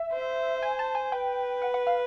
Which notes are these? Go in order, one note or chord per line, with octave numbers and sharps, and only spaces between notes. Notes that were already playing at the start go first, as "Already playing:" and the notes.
Already playing: E5
C5
G#5
A5
G#5
B4 G5
F#5
F#5
F5